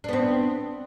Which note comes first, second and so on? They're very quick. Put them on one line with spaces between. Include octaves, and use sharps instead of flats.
D4 B3 C4